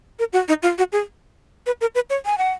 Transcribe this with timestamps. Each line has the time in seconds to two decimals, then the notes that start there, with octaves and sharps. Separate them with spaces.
0.19 A#4
0.33 F#4
0.48 D#4
0.63 F4
0.78 F#4
0.92 G#4
1.66 B4
1.81 A#4
1.95 B4
2.10 C#5
2.26 G#5
2.38 F#5